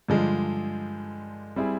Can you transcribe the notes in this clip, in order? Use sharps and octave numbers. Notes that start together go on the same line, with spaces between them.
G2 D3 F3 G#3
G3 C4 E4 G#4